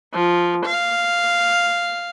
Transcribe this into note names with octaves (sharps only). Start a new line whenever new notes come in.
F3
F5